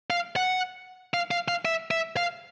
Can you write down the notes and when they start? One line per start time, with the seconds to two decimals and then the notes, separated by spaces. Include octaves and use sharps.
0.10 F5
0.36 F#5
1.14 F5
1.31 F5
1.48 F5
1.65 E5
1.91 E5
2.17 F5